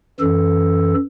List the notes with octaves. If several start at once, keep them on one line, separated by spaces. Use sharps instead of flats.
F#2 E3 A4